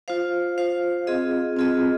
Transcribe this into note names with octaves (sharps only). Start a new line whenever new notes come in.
F4 C5 F5
F4 C5 F5
C4 F4 G#4 D#5
C4 F4 G#4 D#5